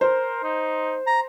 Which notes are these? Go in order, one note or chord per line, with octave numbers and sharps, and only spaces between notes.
A#4 C5
D#4
A#5